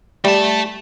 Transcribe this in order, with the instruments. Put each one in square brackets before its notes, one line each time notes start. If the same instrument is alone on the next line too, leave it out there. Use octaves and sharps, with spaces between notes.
[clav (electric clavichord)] G3 [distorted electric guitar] A3 A5